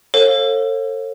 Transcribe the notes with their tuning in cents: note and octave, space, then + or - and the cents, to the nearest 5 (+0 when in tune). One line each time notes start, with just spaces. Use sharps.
A4 +35 C#5 -40 F5 +10